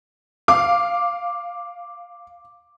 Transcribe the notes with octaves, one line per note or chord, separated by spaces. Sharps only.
F5 D6